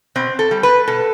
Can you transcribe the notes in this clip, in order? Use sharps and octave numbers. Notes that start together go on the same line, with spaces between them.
B2 C4
A4
G3
B4
B2 A4